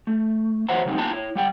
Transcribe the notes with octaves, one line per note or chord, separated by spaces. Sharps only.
A3
E2 F#3 C5 E5 F#5 A#5
C#3 F#3 G3 C4 D#4
A#3 B3 F4 G5 A5 A#5
E4 C#5
G3 F#5 G5